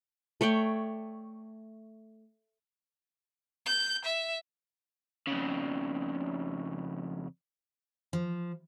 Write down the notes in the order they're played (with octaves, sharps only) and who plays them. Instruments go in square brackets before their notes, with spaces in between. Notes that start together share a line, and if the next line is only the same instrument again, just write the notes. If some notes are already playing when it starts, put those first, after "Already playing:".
[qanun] A3 C#5 D5 G5
[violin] G6
E5
[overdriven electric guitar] F2 C#3
[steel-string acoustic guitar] F3